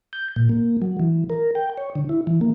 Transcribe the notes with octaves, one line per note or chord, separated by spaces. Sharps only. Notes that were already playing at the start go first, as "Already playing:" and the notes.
G6
A#2
A#3
F#3
E3
A#4
G5
C#5
D3
E4
E3
A#3